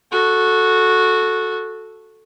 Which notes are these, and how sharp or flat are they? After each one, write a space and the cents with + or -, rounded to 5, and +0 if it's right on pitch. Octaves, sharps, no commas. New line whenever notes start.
F#4 -10 A4 +0